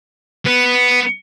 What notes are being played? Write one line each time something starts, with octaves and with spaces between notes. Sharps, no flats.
B3